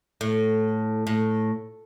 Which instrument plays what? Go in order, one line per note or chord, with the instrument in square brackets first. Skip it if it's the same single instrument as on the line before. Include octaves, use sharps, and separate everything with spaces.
[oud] A2
A2